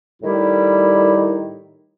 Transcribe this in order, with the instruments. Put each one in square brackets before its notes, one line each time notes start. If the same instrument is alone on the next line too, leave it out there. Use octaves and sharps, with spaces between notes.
[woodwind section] A2 D#3 G3 E4 G4